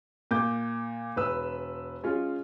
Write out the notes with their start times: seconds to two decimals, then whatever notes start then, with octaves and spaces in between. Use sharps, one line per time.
0.31 A#2 D6 G6
1.16 E1 B4 E6
2.03 G#3 C#4 F4